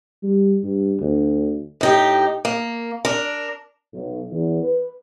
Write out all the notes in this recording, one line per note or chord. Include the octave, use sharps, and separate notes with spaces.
G3
G2
D2
A2 D#4 G4
A#3
D4 A#4
B1
E2
B4